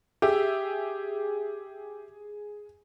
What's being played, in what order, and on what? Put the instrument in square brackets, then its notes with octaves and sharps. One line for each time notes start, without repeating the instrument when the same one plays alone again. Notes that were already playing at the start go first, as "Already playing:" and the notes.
[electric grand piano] G4 E5 [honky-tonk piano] G#4